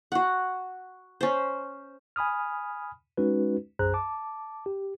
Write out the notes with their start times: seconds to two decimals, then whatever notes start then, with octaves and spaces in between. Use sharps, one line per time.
0.12 F#4 F#5
1.21 C#4 C5
2.16 G#5 B5 D#6 F6
3.17 G#3 C#4 D#4 F#4 B4
3.79 B1 F#2 G#4 C5 A#5 F#6
3.94 A5 D6
4.66 G4